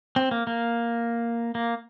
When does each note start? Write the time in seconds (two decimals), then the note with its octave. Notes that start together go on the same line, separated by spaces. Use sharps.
0.16 C4
0.31 A#3
0.47 A#3
1.55 A#3